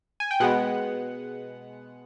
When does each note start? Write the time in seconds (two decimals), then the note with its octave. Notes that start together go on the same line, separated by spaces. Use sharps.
0.20 G#5
0.31 G5
0.40 B2 G#3 B3 F#5